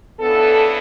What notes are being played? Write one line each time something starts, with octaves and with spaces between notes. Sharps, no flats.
C#3 E3 B3 D4 A4